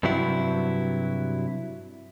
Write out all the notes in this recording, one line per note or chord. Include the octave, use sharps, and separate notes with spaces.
G2 C3 F#3 E4